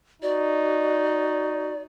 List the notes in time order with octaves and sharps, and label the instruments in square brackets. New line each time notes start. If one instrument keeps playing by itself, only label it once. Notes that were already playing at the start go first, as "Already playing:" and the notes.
[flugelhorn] D#4 [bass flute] F#4 [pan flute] D5